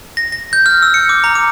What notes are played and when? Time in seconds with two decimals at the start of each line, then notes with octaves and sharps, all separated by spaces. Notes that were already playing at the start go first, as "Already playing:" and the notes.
0.17 A#6
0.32 A#6
0.53 G6
0.66 F6
0.82 E6
0.94 C#7
1.09 D6
1.24 A#5
1.35 D6